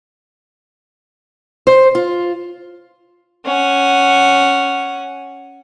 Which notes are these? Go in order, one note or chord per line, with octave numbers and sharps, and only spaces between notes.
C5
F4
C#4 F#5